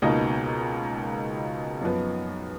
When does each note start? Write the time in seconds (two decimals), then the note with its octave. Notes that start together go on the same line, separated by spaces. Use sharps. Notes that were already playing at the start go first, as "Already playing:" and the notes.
0.02 C#2 B2 A#3 D#4 D#5
1.81 F#2 F3 B3